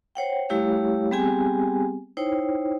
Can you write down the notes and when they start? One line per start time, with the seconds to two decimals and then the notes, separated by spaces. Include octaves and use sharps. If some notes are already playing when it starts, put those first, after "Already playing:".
0.15 C5 C#5 F#5 G5
0.49 G3 A3 E4 G4 C#5 F5
1.11 G3 B3 C4 G4 G#4 G#5
2.17 D#4 E4 C5 C#5 G5